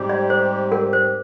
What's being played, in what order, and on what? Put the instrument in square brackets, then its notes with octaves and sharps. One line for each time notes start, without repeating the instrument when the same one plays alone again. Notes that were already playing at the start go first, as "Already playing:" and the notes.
Already playing: [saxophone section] G#2 G3 C4 G4
[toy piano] D5
C5
A#4
C5